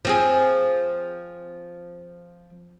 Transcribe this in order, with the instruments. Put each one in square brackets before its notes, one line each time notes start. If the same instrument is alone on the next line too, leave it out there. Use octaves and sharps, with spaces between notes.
[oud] F3 C4 G#4